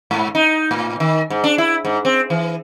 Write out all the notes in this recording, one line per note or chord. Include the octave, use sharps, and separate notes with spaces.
G#2
D#4
A2
D#3
G#2
D4
E4
G#2
C4
E3